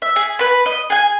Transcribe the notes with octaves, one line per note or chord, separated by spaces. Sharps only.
E5
G#4
B4 B5
D#5
G#4 G#5